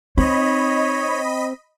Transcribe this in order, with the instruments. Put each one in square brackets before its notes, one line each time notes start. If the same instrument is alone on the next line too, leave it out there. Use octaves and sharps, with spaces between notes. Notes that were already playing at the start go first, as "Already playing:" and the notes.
[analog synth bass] C4 [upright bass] D#4 [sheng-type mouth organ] C#5 [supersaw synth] D#5 B5